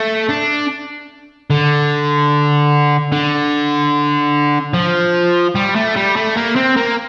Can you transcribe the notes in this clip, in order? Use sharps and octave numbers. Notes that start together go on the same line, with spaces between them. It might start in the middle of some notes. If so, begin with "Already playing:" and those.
Already playing: A3
D4
D3
D3
F3
G3
A3
G3
A3
A#3
C4
A#3